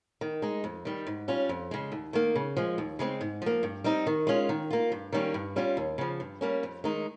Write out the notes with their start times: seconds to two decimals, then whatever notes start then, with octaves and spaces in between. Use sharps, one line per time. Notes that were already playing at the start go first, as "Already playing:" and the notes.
0.21 D#3
0.42 G#3 D#4
0.64 F2
0.85 D#3 G3
1.07 G#2
1.28 G3 C#4 F4
1.49 F2
1.71 C#3 G#3
1.92 D#2
2.13 D#3 A#3
2.36 C#3
2.57 F3 G#3
2.78 D#2
2.99 C#3 G#3 C4
3.21 G#2
3.42 F3 A#3
3.63 G2
3.84 G3 C4 D#4
4.07 D#3
4.27 G#3 C#4 F4
4.49 D#3
4.70 A#3 F4
4.92 G2
5.12 D#3 G3 A#3 C#4
5.34 G2
5.56 G3 C#4 F4
5.77 D#2
5.98 C#3 F3
6.20 G2
6.41 G3 A#3 C#4
6.63 F2
6.84 D#3 G#3 D#4